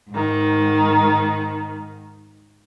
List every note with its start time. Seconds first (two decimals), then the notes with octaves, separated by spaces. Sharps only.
0.11 G#2 D#3